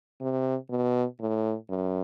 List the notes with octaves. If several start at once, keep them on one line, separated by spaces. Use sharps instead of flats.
C3
B2
A2
F#2